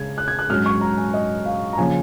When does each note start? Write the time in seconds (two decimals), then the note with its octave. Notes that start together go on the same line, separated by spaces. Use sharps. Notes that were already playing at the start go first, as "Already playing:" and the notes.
Already playing: C#3 G#3 G#6
0.18 F#6
0.28 G#6
0.39 F#6
0.50 G#2 F#3 C#4 F6
0.66 C#6
0.81 A#5
0.98 G#5
1.14 D#5
1.46 F5
1.73 A#5
1.78 C#3 F3 A#3 C#4 G#5